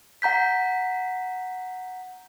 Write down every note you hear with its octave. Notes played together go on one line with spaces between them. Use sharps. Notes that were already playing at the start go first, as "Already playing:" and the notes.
F#5 A#5 G6 B6